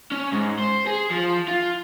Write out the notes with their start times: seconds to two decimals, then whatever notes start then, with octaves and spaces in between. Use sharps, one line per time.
0.11 C#4
0.32 G#2
0.59 C5
0.87 G#4
1.11 F3
1.48 F4